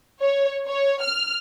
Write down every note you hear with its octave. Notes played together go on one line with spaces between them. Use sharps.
C#5
C#5
F6